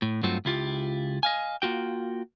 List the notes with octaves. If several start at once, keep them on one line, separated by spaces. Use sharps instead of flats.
A2
G2 F#3 A3 C4 F4 F#4
C#2 E4 F4 G4
D#5 F5 G#5
A#3 F4 F#4 G5